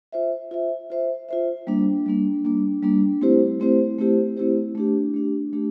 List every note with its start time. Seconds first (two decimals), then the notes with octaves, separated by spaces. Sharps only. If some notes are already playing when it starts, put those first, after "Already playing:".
0.13 F4 C5 E5
0.51 F4 C5 E5
0.90 F4 C5 E5
1.29 F4 C5 E5
1.67 G3 A#3 D4
2.06 G3 A#3 D4
2.45 G3 A#3 D4
2.83 G3 A#3 D4
3.21 A3 C4 E4 G4 C5
3.60 A3 C4 E4 G4 C5
3.98 A3 C4 E4 G4 C5
4.37 A3 C4 E4 G4 C5
4.75 A3 D4 G4
5.14 A3 D4 G4
5.53 A3 D4 G4